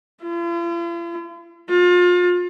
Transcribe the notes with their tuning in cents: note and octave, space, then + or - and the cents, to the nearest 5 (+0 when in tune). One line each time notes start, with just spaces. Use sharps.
F4 -45
F4 +30